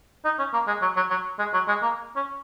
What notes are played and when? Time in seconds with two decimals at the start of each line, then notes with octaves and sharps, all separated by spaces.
0.25 D#4
0.39 C#4
0.53 A#3
0.67 G#3
0.82 F#3
0.96 F#3
1.10 F#3
1.39 G#3
1.54 F#3
1.68 G#3
1.82 A#3
2.16 C#4